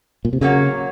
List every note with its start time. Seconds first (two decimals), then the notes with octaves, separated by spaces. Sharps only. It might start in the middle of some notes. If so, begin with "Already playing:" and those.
0.25 A#2
0.33 C3
0.41 C#3 F#3 A#3 C#4 F#4